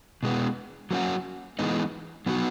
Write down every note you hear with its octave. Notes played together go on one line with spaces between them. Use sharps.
B2 G#3 B3
F#3 A#3 C#4 F#4
E3 G#3 B3 D#4
F#3 B3 D#4 F#4